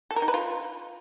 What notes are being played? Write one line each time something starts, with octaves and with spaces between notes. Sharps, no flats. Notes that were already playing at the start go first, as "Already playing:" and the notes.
A4
A#4
D#4
B4
F4